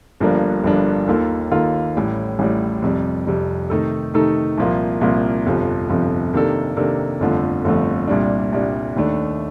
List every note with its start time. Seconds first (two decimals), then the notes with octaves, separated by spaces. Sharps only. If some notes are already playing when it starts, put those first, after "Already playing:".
0.20 G1 G2 F3 A#3 D4
0.63 G1 G2 F3 A#3 D4
1.07 D#2 D#3 A#3 F4 A4
1.51 D#2 D#3 A#3 F4 A4
1.96 A1 A2 G3
2.39 A1 A2 G3
2.82 F2 C3 G3
3.27 F2 C3 G3
3.70 C3 D#3 A3 D#4 A4
4.14 C3 D#3 A3 D#4 A4
4.57 C2 A#2 F3 A#3 F4
5.01 C2 A#2 F3 A#3 F4
5.46 G1 F2 C3 F3
5.89 G1 F2 C3 F3
6.33 C3 D#3 A#3 D4 A4
6.76 C3 D#3 A#3 D4 A4
7.20 G1 F2 D3 F3 A3
7.64 G1 F2 D3 F3 A3
8.07 C2 A#2 G3 D4
8.52 C2 A#2 G3 D4
8.96 D#2 D#3 A3 D4